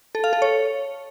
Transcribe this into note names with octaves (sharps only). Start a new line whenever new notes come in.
A4
F5
A4
C#5